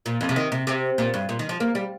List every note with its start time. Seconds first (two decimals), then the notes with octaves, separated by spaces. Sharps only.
0.06 A#2
0.21 F2
0.29 C3
0.36 D#3
0.52 C3
0.67 C3
0.98 A#2
1.14 G2
1.29 A#2
1.39 D#3
1.49 F3
1.60 A#3
1.75 G3